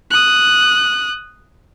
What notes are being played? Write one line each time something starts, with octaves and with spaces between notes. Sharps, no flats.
D#6 F#6